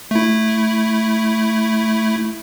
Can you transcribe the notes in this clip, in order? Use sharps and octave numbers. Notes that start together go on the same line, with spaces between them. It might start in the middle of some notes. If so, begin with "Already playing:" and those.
A3 E4